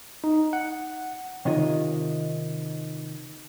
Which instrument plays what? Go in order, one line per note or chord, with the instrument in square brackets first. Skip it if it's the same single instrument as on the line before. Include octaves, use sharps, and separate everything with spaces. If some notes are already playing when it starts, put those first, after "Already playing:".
[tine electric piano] D#4
F#5
[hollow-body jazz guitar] C3 D#3 F4 C#5 D#5